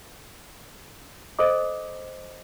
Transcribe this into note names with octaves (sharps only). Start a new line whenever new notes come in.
A4 C5 D#5 D6